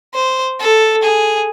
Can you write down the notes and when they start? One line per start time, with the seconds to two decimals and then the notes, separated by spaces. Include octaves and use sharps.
0.14 C5
0.60 A4
1.03 G#4